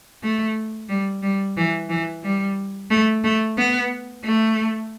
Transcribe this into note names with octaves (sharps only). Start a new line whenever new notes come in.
A3
G3
G3
E3
E3
G3
A3
A3
B3
A3